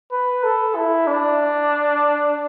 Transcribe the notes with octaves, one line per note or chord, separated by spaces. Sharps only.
B4
A4
E4
D4